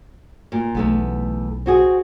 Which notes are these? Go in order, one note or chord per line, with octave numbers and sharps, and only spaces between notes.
A#2
B1 E2 A3 B3
C4 F#4 G#4